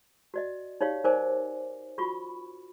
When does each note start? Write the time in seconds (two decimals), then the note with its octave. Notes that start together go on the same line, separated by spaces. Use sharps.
0.34 F#4 D5 D#5
0.81 D#4 G4 C#5 D5 F5
1.04 D#4 A#4 C5 D5 G#5 D6
1.98 F4 F#4 B5 C#6